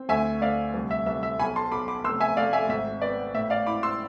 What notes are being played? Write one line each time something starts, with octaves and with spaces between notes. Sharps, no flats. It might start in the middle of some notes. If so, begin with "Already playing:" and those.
Already playing: C4
D2 E5 G#5
D2 D5 F5
C2
E5
C2 E5
E5
B1 G#5 B5
A5 C6
B1 B5 D6
B5 D6
F1 C6 E6
E5 G#5
A3 D5 F5
E5 G#5
G#1 E5
B3 D5
A2 E5
D5 F5
E4 B5 D6
C6 E6